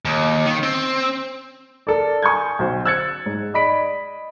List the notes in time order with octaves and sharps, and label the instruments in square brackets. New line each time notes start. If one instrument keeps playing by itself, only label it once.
[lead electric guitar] D#2
D#3
C4
[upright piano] A4 A#4 D5
G#5 C#6 D#6 G6 G#6
B1 C5
E6 F#6 G#6 A6 C#7
G#2
D5 D#5 B5 B6 D7